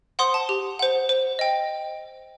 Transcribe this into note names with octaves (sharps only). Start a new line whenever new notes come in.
C5 F#5 C6 D#6
A5
G4
C5 F#5
C5
D#5 G5